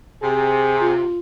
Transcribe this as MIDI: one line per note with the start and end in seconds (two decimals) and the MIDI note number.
0.23 1.09 48
0.23 0.93 68
0.81 1.19 65